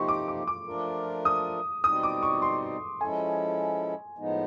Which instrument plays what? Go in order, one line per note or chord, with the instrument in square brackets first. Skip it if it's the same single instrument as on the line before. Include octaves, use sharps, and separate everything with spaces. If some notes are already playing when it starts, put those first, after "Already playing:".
Already playing: [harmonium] C3 F3 A#3 D#4 G4 [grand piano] C6 C#6
[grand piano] D6
D6
D6
[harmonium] F3 A3 D4 F4 A#4
[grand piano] D#6
[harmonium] B2 G3 C4 D#4 [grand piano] D#6
[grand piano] D6
C#6
C6
[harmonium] F3 G#3 C#4 E4 A4 [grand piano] G#5
[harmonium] A2 F3 G#3 B3 D#4